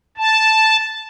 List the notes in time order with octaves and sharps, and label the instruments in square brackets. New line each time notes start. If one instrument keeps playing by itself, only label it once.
[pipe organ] A5